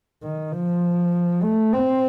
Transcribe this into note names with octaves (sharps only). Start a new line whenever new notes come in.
D#3
F3
A3
C4